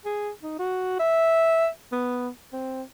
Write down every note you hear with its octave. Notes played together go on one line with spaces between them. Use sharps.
G#4
D#4
F#4
E5
B3
C4